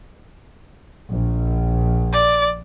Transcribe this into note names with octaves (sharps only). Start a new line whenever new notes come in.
A#1
D5